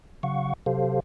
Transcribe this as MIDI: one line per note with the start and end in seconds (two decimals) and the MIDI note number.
0.23 0.53 49
0.23 0.53 54
0.23 0.53 77
0.23 0.53 78
0.23 0.53 85
0.66 1.00 48
0.66 1.00 54
0.66 1.00 67
0.66 1.00 69
0.66 1.00 72
0.66 1.00 77